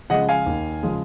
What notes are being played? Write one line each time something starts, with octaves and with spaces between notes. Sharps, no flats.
C#3 F3 G#3 D#5 F#5
F5 G#5
D#2
C#3 F3 G#3